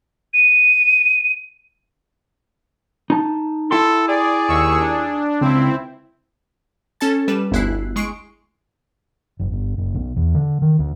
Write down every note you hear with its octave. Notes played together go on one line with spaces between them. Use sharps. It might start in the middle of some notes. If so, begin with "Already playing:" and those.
D#7
D#4 A5
E4 A4 G5 C6
G#4 D5
D#2 C#6 E6
D4
C#2 C4 E4
C#4 A4 A5 A6
G3 B4 E7
G1 D2 E4 F#6 C7
G#3 C#6 C7 D7
F#1
G1
F#1
B1
E2
D3
D#3
D2